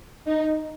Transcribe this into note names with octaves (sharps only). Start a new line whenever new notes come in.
D#4